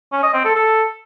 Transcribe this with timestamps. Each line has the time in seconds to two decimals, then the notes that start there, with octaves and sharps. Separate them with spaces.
0.12 C#4
0.23 D#5
0.34 C4
0.45 A4
0.55 A4